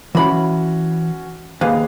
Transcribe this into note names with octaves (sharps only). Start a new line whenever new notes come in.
E3 C#4 F#4 B5
D#2 G#4 B4 F5